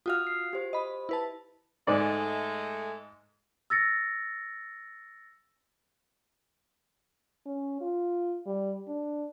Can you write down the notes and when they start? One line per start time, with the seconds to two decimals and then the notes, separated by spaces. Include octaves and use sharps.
0.06 F4 F#4 F5 D#6 F6
0.27 C7
0.53 G4 C5
0.73 D#5 B5
1.09 E4 B4 A5
1.87 G#2 G#3 A3 D5
3.70 E6 A6 A#6 C#7
7.46 C#4
7.81 F4
8.46 G3
8.88 D4